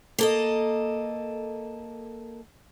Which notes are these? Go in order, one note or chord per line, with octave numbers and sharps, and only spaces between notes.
A#3 A4 D#5